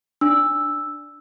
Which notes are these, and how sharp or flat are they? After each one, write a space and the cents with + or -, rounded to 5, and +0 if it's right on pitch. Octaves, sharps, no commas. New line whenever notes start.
D4 +0 E6 +0